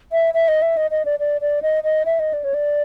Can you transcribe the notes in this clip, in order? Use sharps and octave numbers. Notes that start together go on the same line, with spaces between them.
E5
E5
D#5
E5
D#5
D#5
D5
D5
D5
D#5
D#5
E5
D#5
D5
C#5
D5